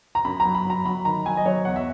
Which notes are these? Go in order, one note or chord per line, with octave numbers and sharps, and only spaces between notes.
A#5
F#2 B5
A#5
F#3
B5
F#3 A#5
F#3 B5
D#3 A#5
F#3 G#5
D#5
F#3 C#5
E2 F#5
E5